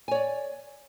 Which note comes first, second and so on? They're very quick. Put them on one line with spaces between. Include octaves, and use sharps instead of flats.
G#5 C#5 D5